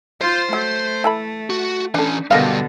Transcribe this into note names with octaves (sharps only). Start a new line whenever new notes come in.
F4 C5 C6
F#3 A3
E3 A4 B5
F#4
E3 C#4 D4 A4
G2 B2 D3 A#4 D#5 F5